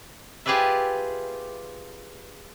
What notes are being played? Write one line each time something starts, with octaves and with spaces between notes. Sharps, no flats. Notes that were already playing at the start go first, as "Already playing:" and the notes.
F4 G4 G#4 B4 D5 E5